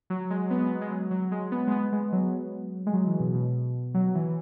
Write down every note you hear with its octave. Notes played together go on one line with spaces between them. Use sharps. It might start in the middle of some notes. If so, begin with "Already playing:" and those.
F#3
G#3
B3
G#3
F#3
F#3
G#3
B3
G#3
B3
G#3
F#3
G#3
F#3
E3
B2
B2
F#3
E3